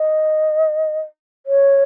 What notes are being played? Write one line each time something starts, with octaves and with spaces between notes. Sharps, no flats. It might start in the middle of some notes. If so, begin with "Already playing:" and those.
Already playing: D#5
C#5